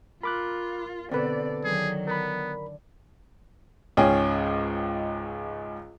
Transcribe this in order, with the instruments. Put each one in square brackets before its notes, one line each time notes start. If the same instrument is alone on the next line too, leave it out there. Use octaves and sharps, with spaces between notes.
[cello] F4 [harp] A#4 [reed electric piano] B5 D6 F#6
[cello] B2 D5 [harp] D3 A4 [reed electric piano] C4 B4
[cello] D#3 F#3 [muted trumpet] G#4
[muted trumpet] B3 [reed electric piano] A#4 B5
[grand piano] C#2 G#2 C#4 G#4 G5